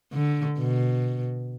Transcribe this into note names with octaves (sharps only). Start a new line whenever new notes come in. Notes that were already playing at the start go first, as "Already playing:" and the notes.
D3
B2